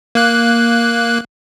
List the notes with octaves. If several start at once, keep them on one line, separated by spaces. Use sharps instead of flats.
A#3 F#6